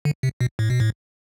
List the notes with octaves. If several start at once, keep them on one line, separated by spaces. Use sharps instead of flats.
D3
C3
B2
A2
B2
A2